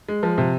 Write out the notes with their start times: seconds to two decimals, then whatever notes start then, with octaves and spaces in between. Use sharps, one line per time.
0.09 G#3
0.23 F3
0.38 C3